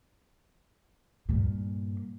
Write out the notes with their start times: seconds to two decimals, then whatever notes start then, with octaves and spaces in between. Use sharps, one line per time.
1.29 G2 A#2